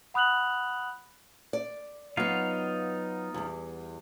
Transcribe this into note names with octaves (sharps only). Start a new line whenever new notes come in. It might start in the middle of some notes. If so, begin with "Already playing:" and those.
F#5 B5 D#6 F#6 F7 F#7
D5
F#3 B3 D#4 F4 F5
E2 G3